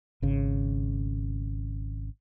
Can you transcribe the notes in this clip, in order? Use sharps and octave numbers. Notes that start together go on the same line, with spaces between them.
G#1 C#3